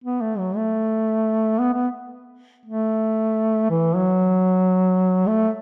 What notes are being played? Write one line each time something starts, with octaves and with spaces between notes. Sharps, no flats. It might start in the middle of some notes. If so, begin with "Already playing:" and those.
B3
A3
F#3
A3
B3
B3
A3
E3
F#3
A3